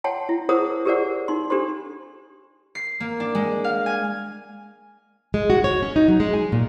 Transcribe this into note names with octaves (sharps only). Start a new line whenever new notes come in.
C#5 F#5 G5 A5 C6
E4
G#4 A#4 C5 C#5 F#5 D#6
G4 G#4 A#4 C5 D5 F#5
D#4 C6
D4 G4 A4 C5 C6
C7
A#3
D4
G#3
F5
G#5
G#3
F#4
C#5
C#4
D#4
F#3
G#3
G#5
A#2